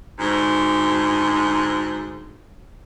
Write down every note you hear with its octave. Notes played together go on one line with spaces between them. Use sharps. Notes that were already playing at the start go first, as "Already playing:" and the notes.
D2 G#2